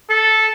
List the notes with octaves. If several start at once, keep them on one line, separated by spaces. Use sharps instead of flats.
A4